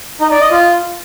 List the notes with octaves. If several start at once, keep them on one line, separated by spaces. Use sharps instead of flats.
D#4
D5
D#5
F4